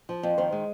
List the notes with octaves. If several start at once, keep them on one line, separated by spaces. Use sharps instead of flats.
F3
F2
D#3 C5
G#3